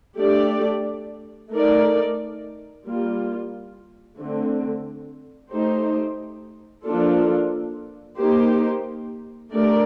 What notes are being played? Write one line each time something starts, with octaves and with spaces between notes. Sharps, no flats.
A3 D4 G4 D5
A3 D#4 A#4 D5
G3 A#3 F4
D3 A3 C4
A3 D#4 G4 C5
F3 A#3 D4 F4 A4
A#3 D#4 G4 C5
A3 D4 G4 A#4 D5